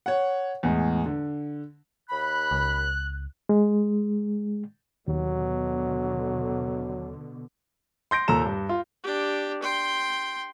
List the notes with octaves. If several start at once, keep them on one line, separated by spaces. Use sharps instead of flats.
C#5 F#5
E2 A2 G#3
D3
D#2 B5 F#6
C#2
G#3
D#2 B2 D3 F#3
C6 G6 A#6 D7
D#2 A#2 A4 A#5 E7
G2
F4
D4 G4
G5 C6